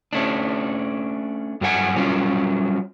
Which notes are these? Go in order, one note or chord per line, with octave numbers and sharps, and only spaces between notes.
A3 C#4 D4
G2 F#3 A4 F#5 G#5
F#3 G3 C#4 F4